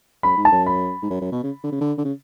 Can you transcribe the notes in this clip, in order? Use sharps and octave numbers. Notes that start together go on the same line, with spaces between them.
F#2 B5
G#2
A5
F#2
B5
G#2
F#2
F#2
B2
C#3
D3
C#3
D3
D3
C#3